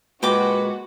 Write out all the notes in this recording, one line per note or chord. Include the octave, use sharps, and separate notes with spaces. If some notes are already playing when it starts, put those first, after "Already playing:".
A#2 G#3 F#4 B4 G5 D6